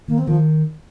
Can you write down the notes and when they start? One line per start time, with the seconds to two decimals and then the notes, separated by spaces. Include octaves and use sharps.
0.08 D#3 A#3
0.18 C4
0.27 D#3 F3